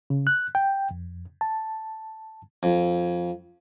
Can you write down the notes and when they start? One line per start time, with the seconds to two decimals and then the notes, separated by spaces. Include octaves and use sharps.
0.10 C#3
0.27 F#6
0.55 G5
0.91 F2
1.41 A5
2.63 F2